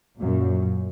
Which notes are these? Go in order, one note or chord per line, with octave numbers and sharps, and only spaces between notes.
F#2 A#2